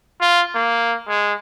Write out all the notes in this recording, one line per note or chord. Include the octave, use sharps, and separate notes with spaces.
F4
A#3
G#3